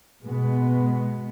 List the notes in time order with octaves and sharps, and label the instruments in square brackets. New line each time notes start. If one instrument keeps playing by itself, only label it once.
[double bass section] B2 G#3 B3